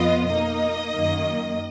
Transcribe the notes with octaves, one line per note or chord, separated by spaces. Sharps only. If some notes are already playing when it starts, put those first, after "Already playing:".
Already playing: F2 F3 B3 F4 D#5
B2 A#3 D#4 D#5
F#2 D#3 A#3